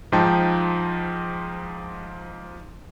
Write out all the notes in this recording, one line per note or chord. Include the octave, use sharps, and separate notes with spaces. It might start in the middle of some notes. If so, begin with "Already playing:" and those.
G#2 F3 D#4 G5 A5